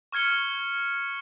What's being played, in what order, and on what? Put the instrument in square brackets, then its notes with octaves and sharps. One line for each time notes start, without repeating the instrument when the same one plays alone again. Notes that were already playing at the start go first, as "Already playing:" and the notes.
[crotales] C#6 F6 G#6 C#7 G7